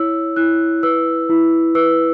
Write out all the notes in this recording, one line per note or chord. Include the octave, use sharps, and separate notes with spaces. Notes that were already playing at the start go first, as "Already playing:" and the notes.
Already playing: E4 C#5 E6
E4 F#6
B4 E6
E4
B4 E6